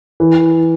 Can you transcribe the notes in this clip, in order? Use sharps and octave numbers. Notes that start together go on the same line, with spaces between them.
E3